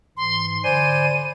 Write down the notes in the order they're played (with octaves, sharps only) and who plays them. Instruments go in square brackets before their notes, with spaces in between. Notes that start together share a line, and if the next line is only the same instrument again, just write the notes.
[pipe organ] G#2 E3 [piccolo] C6
[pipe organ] D3 B5 [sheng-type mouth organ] C5 D5 G#5 [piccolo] D#7